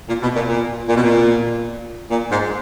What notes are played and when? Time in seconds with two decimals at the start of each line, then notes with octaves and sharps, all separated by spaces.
0.08 A#2
0.23 B2
0.36 A#2
0.48 A#2
0.89 A#2
0.97 B2
1.03 A#2
2.10 A#2
2.30 G#2